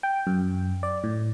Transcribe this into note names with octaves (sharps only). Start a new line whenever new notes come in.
G5
F#2
D5
A2